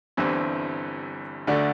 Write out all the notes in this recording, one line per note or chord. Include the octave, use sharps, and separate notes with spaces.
G1 G2 E3 C4 E4
D2 D3 A3 D4